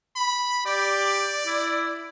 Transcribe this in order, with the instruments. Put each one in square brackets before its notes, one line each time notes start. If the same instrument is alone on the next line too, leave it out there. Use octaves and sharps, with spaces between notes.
[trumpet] B5
[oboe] G4 [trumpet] D5
[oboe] E4